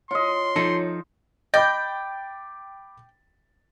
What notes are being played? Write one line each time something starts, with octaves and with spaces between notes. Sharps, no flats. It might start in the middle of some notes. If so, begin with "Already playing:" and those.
F4 C#5 D#5 C6
F3 D#4 A4
D#5 G5 B5 D6 A6